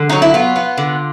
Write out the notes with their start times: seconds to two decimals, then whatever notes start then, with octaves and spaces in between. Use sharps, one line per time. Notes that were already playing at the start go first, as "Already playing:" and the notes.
Already playing: D3
0.10 F#3 D#4
0.22 E4
0.34 B3 F4
0.56 B3
0.78 D3